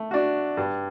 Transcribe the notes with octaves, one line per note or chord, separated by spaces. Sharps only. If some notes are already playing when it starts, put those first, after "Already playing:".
Already playing: A3
D4 F#4
G2